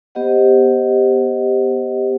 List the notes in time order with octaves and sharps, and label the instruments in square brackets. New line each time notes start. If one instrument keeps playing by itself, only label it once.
[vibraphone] B3 G4 C5 D#5 F#5